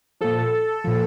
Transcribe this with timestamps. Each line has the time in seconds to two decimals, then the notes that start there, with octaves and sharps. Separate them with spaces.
0.21 A#2 F3 A4
0.84 A#2 F3